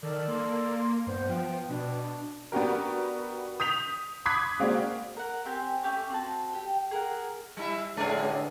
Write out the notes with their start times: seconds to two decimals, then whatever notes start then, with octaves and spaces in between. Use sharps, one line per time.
0.03 D#3 A4 A#4 D5
0.28 A#3 C6
1.07 G2 B3 C5
1.29 F3 G5
1.69 B2 D4
2.52 B3 D4 F#4 G4 A#4
3.60 D#6 G6 B6 F7
4.26 B5 D6 D#6 F#6 G#6 B6
4.60 G#3 A#3 C4 F#4 D5
5.17 A#4 F#5
5.45 C4 G4 G#5
5.83 A3 C#4 G4 D6
6.10 C4 F#4 A5
6.53 G4 G5
6.91 G#4 A#4 F#5
7.57 G3 E4 E5
7.97 A1 A2 D3 G#3 C#4 G#4